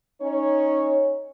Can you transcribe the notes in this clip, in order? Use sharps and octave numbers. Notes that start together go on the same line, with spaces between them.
C#4 D#4 C#5